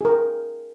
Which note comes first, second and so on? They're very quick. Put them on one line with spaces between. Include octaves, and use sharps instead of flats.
G#4 A#4 G5